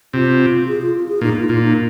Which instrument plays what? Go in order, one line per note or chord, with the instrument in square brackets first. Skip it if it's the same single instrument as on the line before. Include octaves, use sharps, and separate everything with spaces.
[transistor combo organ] C3 [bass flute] F4
[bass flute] G#4
F4
F4
G#4
[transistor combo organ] A#2 [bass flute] D#4
[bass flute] F4
[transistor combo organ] A#2 [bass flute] F4
[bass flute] D#4